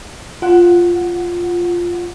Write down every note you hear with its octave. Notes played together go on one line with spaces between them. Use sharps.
F4 F#5